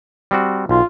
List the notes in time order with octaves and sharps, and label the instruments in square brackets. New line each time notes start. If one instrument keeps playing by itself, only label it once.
[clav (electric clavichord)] G3 C4 F#4
[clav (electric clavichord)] B1 [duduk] F4